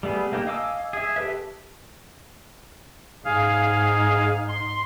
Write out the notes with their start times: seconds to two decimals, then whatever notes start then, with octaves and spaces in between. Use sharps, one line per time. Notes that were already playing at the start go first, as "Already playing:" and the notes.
0.03 G3 A3 B3 G#4
0.32 A3 A#3 D#4 G4
0.47 D#5 F5 G#5 D6 E6
0.93 G#4 E5
1.16 G4 A4 B4 E5
3.25 G#2 D#4 G#4 F5
4.48 C6